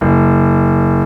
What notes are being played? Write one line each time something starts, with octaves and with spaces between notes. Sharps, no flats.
F#1